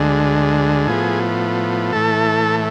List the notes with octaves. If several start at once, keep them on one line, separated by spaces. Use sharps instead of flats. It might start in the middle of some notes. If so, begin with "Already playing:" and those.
Already playing: D2 D3 G#3
A2 F3 B3 G#4
A2 E3 A3 A4